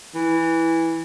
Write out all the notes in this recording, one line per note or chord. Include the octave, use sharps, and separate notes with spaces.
E3